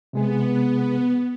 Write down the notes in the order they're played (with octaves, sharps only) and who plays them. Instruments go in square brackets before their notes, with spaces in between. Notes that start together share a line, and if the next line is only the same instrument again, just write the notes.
[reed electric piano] C3 G#3 G#4 [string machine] B3